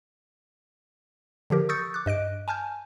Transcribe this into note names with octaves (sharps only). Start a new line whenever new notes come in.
D3 F3 G4 A#4
C#6 D#6 E6 G6 A6 C#7
D6 F#6
G2 D#5 F#6 D7
G#5 A5 F6 G6